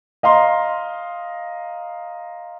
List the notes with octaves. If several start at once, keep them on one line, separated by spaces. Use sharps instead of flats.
D#5 F5 A#5 C6